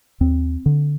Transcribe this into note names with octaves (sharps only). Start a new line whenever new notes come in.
D#2 C4
D3